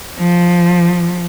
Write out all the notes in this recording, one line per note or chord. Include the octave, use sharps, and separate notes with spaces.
F3